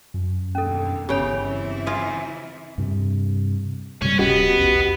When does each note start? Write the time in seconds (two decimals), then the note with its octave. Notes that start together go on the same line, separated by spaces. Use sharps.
0.14 F#2
0.55 D#2 B2 D3 C#4 A4
1.09 G1 C#3 E3 B3 G4 C#5 G5 B5
1.44 E3 C4 E4
1.87 F4 G#4
2.78 G2 C3
4.02 G2 C3 G3 C#4
4.19 D1 B3 C#4 F#4 G4 D#5
4.59 B1 E2